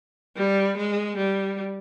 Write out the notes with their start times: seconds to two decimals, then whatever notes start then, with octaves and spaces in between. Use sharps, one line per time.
0.36 G3
0.77 G#3
1.17 G3